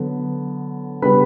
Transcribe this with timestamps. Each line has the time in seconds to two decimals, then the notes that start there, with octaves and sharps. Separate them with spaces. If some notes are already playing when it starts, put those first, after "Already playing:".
Already playing: D3 F#3 B3
1.02 C#3 G3 B3 D4 B4 B5